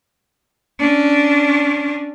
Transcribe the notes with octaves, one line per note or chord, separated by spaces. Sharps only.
C#4 D4